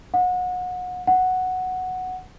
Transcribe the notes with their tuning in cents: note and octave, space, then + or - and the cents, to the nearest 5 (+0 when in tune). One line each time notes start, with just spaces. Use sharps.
F#5 -30
F#5 +0